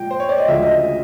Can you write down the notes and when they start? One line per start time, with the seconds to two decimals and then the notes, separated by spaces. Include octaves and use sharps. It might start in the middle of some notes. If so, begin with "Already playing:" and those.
Already playing: A#2 F3 G#3 G5
0.11 C5
0.20 C#5
0.29 D5
0.38 D#5
0.48 D2 C#3 F3 G#3 E5
0.63 D#5